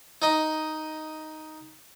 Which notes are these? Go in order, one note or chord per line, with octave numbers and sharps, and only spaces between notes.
D#4 D#5